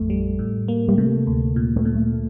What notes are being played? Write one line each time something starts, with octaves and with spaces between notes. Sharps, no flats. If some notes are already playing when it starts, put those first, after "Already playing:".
Already playing: A1 F2 A3
G3
A2
A#3
G3
C3 A3
D2
A#2
A3
A#2
A3